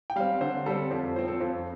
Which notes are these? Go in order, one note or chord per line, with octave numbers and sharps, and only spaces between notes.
G5
G3 C4 F5
D3 C5
G3 C4 A4
F2 C5
A4
F3 C4 C5
A4
F2 C5